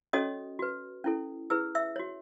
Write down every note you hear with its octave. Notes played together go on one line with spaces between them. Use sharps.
C#4 F#4 A4 C#5 D#5 D#6
F#4 B4
C#4 E4 A4
E4 G#4 B4 E6
E5 E6
F#4 C#5